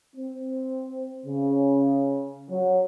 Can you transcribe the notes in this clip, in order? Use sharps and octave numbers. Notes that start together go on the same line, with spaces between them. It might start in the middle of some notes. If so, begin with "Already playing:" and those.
C4
C#3
F#3